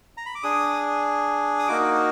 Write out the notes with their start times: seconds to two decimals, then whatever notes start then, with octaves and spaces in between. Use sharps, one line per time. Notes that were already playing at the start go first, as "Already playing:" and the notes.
0.17 A#5
0.26 B5
0.35 D6
0.43 D4 G#4 D#6
1.59 D#6
1.68 A#3 D#4 F#4 D6